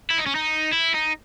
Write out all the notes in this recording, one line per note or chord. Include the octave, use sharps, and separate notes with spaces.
E4
D#4
C#4
D#4
E4
D#4